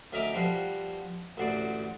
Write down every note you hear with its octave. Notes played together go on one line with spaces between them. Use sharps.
D2 C#4 D#5 E5 A#5 D6
F3 G3 F#4 B4 C5 C6
A1 D2 F#4 C5 D5